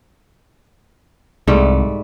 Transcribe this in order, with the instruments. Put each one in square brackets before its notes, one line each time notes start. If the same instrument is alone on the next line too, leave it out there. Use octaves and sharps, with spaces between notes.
[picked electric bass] C2 [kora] G#2 G3 A3